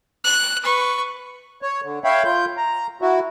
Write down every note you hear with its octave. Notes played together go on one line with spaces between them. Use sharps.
F#6
B4 C#6
C#5
D3
C#5 E5 F5 G5 B5
F4 G6
A#5
E4 F#4